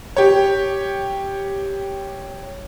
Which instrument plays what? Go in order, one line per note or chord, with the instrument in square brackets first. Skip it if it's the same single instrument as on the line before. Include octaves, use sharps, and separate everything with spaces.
[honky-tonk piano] G4 C#5